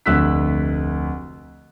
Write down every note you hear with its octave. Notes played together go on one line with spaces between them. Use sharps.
F1 D2 E6 F#6 B6